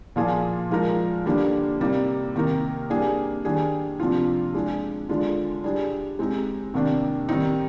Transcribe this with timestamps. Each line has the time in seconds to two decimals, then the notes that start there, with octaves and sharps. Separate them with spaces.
0.16 A#2 F3 A#3 F4 G#4
0.71 F3 G#3 D#4 A#4
1.26 D3 G3 A#3 D4
1.80 C3 G3 A#3 D#4
2.36 C3 D#3 A#3 D#4 A#4
2.90 G3 A#3 D4 G#4
3.45 D#3 G3 A#3 D4 G#4
4.00 C3 F3 A#3 D4 F4
4.55 G#3 D4 G#4
5.09 D3 G#3 D4 F4
5.64 G3 D4 G#4
6.19 G#3 C4 D#4 G4
6.74 C3 D#3 A#3 D4
7.29 D#3 G3 C4 D#4